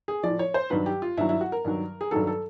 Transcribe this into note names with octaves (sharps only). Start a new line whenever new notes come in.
G#4
A2 F3 D5
C#5
C5
G2 D#3 F#3 B4
G4
F4
G2 D#3 F#3 E4
E4
F#4
A#4
G2 D#3 F#3
G#4
G2 D#3 F#3 A4
A4